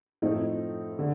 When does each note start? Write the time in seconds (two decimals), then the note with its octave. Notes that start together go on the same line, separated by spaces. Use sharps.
0.22 A2 F3 A3 C4 D#4
0.99 D3